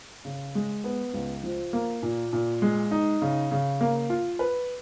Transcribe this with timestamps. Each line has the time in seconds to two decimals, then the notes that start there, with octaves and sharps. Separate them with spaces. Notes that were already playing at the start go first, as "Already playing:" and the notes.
0.25 C#3
0.55 G#3
0.84 B3
1.14 C#2
1.44 F3
1.73 A#3
2.03 A#2
2.33 A#2
2.62 G#3
2.91 D#4
3.22 C#3
3.51 C#3
3.81 A#3
4.10 F4
4.39 B4